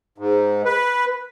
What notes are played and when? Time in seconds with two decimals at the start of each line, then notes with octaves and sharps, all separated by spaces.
0.18 G#2
0.65 B4